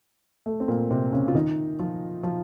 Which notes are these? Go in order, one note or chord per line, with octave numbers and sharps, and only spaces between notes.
A3
C4
A#2 A#3
C3 C4
C#3 C#4
F4
D#3 D#4
F3 F4
F3 F4